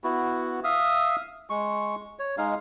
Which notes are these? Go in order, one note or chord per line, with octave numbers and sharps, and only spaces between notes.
B3 E4 F#4
E5 F5 D#6
G#3 C#6
C#5
G#3 D#4 F5